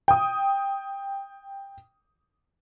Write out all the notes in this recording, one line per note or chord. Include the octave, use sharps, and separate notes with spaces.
G5 D#6